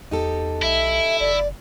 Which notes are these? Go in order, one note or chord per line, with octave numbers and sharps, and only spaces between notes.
E2 D#4 G4 A4
B1 E4 E5
F#1 D5